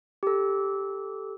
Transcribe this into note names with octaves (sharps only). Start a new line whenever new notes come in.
G4 A4